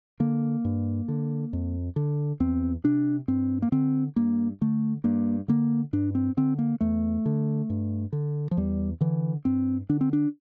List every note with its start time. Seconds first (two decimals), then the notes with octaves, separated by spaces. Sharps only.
0.20 D3 A#3
0.65 G2
1.08 D3
1.53 F2
1.96 D3
2.40 E2 C4
2.84 C3 D4
3.28 G2 C4
3.62 A#3
3.72 D3 C4
4.16 G2 A#3
4.61 D3 A3
5.04 G2 A#3
5.48 D3 A#3
5.93 G2 D4
6.15 C4
6.37 D3 C4
6.59 A#3
6.81 E2 A3
7.26 D3
7.70 G2
8.13 D3
8.51 F3
8.57 E2 G3
9.01 D3 E3
9.45 G2 C4
9.89 D3 D4
10.01 C4
10.13 D4